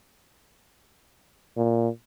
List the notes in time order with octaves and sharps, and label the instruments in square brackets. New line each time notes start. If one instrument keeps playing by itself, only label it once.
[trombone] A#2